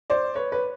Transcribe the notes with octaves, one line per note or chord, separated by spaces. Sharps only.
C5 D5
B4 C#5
B4